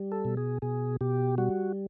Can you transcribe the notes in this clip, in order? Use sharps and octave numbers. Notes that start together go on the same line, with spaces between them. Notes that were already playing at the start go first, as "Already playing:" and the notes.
Already playing: G3
A4
B2
G#4
B2 G#4
B2 G4
G3 F#4